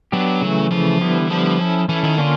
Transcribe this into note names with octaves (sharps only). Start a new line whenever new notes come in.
F#3 B3 D4 G4
C#3 E3 A3
C#3 E3 F3 A3
D3 G3 B3 E4
E3
D3 F3 G3 B3 E4
C#4 E4 A4
E3 C#4 E4 A4
D#3
D3 A#3 C#4 F4